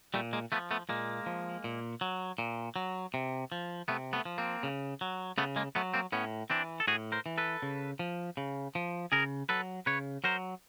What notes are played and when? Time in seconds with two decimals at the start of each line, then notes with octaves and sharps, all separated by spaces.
0.14 A#2 G3 A3
0.33 G#3 A#3
0.52 F3 A3 B3
0.71 A3 B3
0.89 A#2 G#3 A#3
1.26 F3
1.64 A#2
2.01 F#3
2.38 A#2
2.76 F#3
3.14 C3
3.52 F3
3.88 C3 A3 B3
4.13 A3 B3
4.25 F3
4.38 A#3 C4
4.63 C#3
5.01 F#3
5.38 C#3 A3 B3
5.56 G#3 A#3
5.75 F#3 A3 B3
5.94 A#3 C4
6.12 A2 B3 C#4
6.50 E3 C4 D4
6.80 A4
6.87 A2 F#4 G#4
7.12 A#4 C5
7.26 E3
7.38 A4 B4
7.62 C#3
7.99 F3
8.37 C#3
8.75 F3
9.12 C#3 G#4 A#4
9.49 F#3 A4 B4
9.86 C#3 B4 C#5
10.24 F#3 A#4 C5